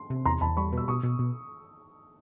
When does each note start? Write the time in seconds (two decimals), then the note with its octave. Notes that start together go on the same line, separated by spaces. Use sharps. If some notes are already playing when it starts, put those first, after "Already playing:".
Already playing: C6
0.10 C3
0.25 E2 A#5 C6
0.41 E2 A5 B5
0.57 G3 B5 C#6
0.72 B2 E6
0.88 B2 C#6 D#6
1.03 B2
1.19 B2